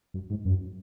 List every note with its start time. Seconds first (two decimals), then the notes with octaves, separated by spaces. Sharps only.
0.14 F#2
0.30 G#2
0.45 F#2